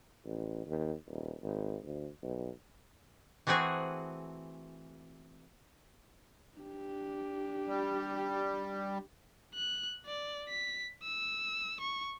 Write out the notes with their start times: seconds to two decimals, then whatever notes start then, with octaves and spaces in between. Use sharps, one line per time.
0.25 A1
0.67 D#2
1.07 D#1
1.43 G#1
1.84 D2
2.23 B1
3.47 E3 A3 C4 F#4 G#4
6.58 D4 G4
7.67 G3
9.55 F#6
10.06 D5
10.49 B6
11.03 E6
11.80 C#6